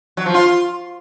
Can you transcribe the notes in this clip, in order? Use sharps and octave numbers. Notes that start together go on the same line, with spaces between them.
F#3
F3
F4